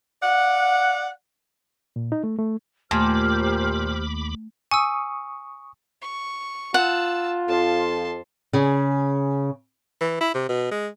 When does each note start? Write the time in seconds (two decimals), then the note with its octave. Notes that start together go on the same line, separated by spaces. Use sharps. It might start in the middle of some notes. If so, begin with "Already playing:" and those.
0.23 D5 F5 F#5
1.96 A#2
2.12 D#4
2.24 A3
2.38 A3
2.91 D#2 A#2 A3 G4 C5 B5 D6 F6
4.71 G#5 C#6 D#6 E6
6.02 C#6
6.74 F4 F#5 A5 E6
7.49 F2 F3 A5 C6
8.53 C#3 G#4
10.01 E3
10.21 E4
10.34 C3
10.49 B2
10.71 G#3